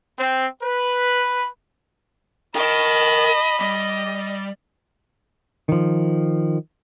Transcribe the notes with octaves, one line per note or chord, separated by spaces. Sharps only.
C4
B4
A#4 D#5 G5 A5 B5
G3 D#5
D#3 F3